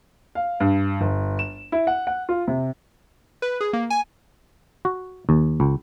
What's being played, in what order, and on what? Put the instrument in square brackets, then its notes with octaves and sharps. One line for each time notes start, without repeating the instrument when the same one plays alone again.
[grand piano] F5
G2
G1
E7
E4
F#5
F#5
F4
C3
[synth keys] B4
G#4
A#3
G#5
[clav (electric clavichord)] F#4
D#2
C#2